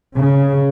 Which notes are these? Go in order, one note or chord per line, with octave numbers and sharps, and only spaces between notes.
C#3